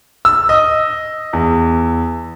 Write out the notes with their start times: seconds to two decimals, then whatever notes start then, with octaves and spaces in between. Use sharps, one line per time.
0.25 E6
0.49 D#5
1.33 E2